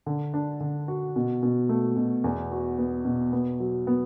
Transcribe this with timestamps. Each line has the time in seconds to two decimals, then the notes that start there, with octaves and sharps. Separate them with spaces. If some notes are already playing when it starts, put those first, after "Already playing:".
0.06 D3
0.34 D4
0.60 D3
0.88 F#4
1.16 B2
1.43 B2
1.69 A3
1.97 B2
2.24 E2
2.51 F#4
2.78 B3
3.05 B2
3.33 B3
3.60 F#3
3.87 B3